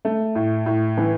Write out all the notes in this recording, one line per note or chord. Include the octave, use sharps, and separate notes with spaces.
A3
A2
A2
E3